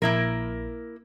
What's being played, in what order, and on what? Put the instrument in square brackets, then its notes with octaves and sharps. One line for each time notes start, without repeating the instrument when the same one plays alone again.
[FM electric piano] A#1 [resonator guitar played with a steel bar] A#3 E4 A#4